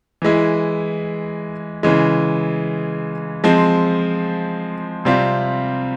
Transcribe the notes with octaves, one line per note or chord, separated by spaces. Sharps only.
E3 G#3 E4
C#3 E3 G#3
F3 G#3 C4
C3 G3 C4 F4